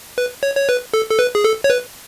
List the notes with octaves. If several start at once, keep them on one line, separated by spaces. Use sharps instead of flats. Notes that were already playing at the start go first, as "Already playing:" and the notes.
B4
C#5
C#5
B4
A4
A4
B4
G#4
A4
C#5
B4